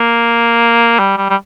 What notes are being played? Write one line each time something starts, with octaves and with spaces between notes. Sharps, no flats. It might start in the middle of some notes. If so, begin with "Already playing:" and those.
Already playing: A#3
G3
G3
G3